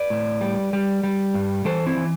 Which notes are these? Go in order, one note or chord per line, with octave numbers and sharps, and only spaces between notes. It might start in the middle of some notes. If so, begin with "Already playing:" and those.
Already playing: B4 D5
A2
G3
G3
G3
G2
E3 A4 C5
C4 E4
E3